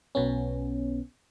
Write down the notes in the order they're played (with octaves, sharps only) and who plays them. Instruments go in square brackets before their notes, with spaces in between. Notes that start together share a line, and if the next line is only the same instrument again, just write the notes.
[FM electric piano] B1 B2 B3 C#4